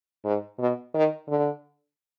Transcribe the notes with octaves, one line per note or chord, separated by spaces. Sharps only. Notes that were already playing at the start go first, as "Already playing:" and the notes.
G#2
B2
D#3
D3